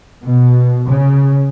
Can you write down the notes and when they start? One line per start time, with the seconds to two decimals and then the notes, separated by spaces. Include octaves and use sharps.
0.24 B2
0.89 C#3